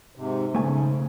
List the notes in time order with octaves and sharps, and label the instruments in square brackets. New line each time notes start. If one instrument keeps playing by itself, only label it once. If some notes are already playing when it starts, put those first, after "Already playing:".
[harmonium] G#2 C3
[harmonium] G#2 [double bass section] C#3 [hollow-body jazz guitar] A3 G#5